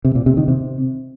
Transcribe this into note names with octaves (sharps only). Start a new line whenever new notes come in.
C3
A#2
C3
D#3
C3